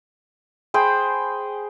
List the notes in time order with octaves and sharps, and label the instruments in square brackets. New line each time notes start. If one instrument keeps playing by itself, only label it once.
[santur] G#4 C5 G5 B5